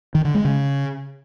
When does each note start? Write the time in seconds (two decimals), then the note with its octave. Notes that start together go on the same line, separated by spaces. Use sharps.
0.15 D#3
0.25 D3
0.35 G#3
0.45 C#3